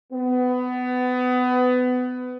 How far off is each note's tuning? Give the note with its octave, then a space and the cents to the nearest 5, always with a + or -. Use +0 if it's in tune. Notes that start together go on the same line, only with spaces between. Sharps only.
B3 +25